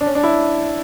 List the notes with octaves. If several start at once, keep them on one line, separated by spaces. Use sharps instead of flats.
D4
C#4
D4
E4